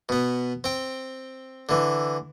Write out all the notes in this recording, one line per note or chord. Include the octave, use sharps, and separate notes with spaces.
B2 B3
C4 G5
D3 E3